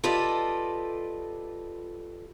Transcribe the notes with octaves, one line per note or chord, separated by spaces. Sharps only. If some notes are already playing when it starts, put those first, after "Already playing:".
F4 G4 A4 B4 D5 D#5